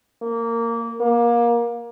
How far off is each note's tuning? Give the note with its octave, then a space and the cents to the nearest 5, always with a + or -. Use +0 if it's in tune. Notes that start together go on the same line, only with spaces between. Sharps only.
A#3 -15
A#3 +20